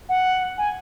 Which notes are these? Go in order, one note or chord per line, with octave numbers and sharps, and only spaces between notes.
F#5
G#5